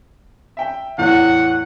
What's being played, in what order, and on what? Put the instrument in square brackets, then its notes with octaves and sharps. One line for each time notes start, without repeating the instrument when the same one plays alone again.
[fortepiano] E5 G5
[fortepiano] E2 A2 [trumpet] F#5